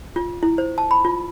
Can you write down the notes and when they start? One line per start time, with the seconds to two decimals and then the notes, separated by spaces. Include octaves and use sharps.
0.16 F4
0.43 E4
0.58 C5
0.78 A5
0.91 B5
1.05 F4